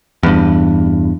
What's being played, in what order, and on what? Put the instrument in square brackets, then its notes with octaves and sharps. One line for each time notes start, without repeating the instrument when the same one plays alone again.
[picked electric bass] E2 G2